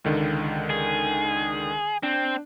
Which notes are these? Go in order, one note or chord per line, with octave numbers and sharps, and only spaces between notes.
C#2 D3 D#3
G#4
C4 D4